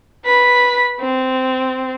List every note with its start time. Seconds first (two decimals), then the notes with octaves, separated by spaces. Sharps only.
0.25 B4 B6
1.00 C4